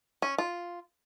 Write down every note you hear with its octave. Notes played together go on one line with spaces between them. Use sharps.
C#4
F4